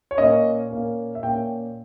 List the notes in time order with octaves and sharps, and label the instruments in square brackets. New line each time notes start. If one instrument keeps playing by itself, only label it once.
[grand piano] C#5
A#2 A#3 C#4 D#5
A#2 A#3 C#4
E5
A#2 A#3 C#4 G5